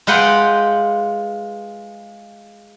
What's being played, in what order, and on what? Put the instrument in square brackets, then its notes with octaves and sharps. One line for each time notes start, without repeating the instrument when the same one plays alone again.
[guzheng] G#3 F4 B4 F#5 G5